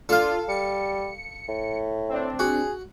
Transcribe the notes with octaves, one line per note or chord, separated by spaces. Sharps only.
D4 F4 A4 F5
G3 C#7
A2
C4 D4
F#4 G#4